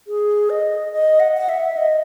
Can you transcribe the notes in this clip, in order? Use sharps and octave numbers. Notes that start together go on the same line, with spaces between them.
G#4
D#5
D#5
F#5
F#5
E5
D#5